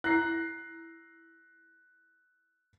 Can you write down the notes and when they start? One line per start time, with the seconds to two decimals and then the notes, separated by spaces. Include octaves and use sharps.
0.04 E4 F#6 A#6 C7